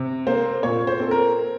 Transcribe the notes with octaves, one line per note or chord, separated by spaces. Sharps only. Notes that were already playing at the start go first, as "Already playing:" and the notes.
Already playing: C3 C4
A#3 C5
A#2 C#5
C5
C4 A4
A#4